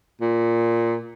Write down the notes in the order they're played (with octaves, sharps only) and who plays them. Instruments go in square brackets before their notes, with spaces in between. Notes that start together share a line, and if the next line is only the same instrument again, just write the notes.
[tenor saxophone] A#2